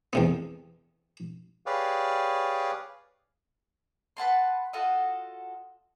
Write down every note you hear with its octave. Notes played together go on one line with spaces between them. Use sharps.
E2 C3 B3
G4 G#4 B4 C#5 D5 F5
B4 F#5 A5 C6
F4 F#4 A4 D#5